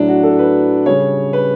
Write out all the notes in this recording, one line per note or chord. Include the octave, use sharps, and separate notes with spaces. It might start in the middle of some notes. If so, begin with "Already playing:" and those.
Already playing: A2 F#3 D4
F#4
A4
B4
C#3 G3 C#5
B4